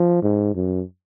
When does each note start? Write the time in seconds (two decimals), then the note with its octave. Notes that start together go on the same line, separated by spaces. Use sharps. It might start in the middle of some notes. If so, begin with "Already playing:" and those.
Already playing: F3
0.23 G#2
0.55 F#2